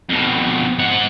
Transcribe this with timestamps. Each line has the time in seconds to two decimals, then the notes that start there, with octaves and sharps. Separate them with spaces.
0.09 F2 B2
0.79 G#2 F#5